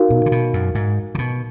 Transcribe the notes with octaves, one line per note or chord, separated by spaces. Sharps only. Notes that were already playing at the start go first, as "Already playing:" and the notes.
Already playing: D#4 F#4 A#4 F5
B2
D3
B2
F#2
G#2
D3
B2